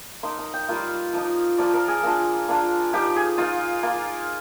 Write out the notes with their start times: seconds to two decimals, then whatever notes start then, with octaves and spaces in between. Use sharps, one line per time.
0.23 A#3 D#4 C6
0.39 A#5
0.54 G5
0.68 G3 A#3 F4 F5
1.13 F3 A#3 D#4
1.58 F3 A#3 F4 D5
1.73 A#4
1.88 G#4
2.03 A#3 D4 F4
2.48 A#3 D4 F4
2.93 F3 A#3 D#4 G4
3.16 G#4
3.38 A#3 D#4 F4
3.83 A#3 F4